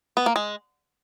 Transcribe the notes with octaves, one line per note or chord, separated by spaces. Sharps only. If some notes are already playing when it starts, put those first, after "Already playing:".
B3
A#3
G#3